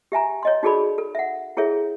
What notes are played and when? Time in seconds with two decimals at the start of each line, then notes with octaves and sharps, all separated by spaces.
0.12 G4 E5 G#5 A#5
0.43 C#5 D#5 C6
0.63 D#4 F#4 G#4 A4 D5 B5
0.98 A4
1.15 E5 F#5
1.57 E4 G#4 A4 C#5 E5